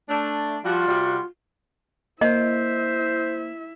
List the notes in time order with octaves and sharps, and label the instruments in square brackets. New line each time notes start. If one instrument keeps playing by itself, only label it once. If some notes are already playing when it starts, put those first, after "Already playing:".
[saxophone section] A3 D4
[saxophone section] F3 G3 F#4 [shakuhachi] F4
[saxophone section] C3 G3 F#4
[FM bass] A#3 [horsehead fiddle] E4 E5 [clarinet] C5 [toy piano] D#5